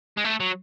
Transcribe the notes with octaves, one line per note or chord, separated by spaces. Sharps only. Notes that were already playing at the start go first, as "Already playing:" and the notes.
G#3
A3
F#3